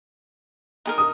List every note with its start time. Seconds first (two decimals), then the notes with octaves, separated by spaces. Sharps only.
0.86 D#4 G#4 A#4
0.98 D#6